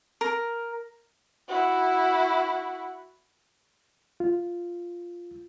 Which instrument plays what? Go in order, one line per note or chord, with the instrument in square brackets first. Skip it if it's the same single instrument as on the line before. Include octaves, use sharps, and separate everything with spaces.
[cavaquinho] A#4
[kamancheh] E4 F#4
[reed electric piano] F4